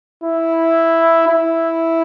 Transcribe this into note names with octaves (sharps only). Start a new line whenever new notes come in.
E4
E4